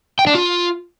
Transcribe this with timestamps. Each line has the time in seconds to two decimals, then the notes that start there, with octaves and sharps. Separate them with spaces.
0.19 G5
0.27 D4
0.35 F4